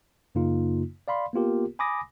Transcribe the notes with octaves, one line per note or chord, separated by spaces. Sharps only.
F#2 C#3 A#3 D#4 F4
D5 F5 B5 C6
A#3 B3 F4 G4 A#4
G#5 B5 D6 D#6 A#6